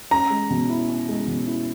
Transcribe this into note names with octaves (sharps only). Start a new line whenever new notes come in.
C#4 A#5
G#3
B2
E4
C#4
G#3
B2
E4